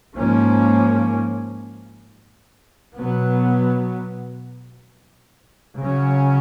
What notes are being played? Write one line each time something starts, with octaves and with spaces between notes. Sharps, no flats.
G#2 F3 A#3 C#4
B2 F#3 B3
C#3 F#3 C#4